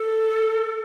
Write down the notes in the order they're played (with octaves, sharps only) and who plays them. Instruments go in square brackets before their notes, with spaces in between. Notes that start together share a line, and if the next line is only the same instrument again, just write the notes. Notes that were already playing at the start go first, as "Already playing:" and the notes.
Already playing: [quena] A4